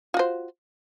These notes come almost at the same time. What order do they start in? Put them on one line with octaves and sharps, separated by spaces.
F4 F#4 C5